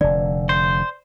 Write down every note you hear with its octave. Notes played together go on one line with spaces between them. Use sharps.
F1 D3 D5
C5